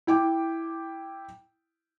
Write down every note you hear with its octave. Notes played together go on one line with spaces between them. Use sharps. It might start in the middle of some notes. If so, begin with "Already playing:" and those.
E4 G5 D6